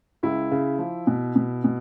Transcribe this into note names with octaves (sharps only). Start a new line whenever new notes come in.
C#2 E4
C#3
F3
B2
B2
B2